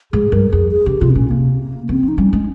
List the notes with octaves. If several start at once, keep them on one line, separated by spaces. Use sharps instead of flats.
G#2 G#4
G2 A#4
F2 G#4
G#4
C#3 G4
C3 F4
C4
A#2 C#4
C3 A#3
C#3 C4
F3
D#4
G3 C#4
G#3